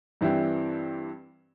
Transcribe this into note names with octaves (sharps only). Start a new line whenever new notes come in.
G2 E3 C4 D4 E4 G4